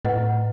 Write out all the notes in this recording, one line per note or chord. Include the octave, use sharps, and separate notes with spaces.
A2 E4 B4 D#5 F#5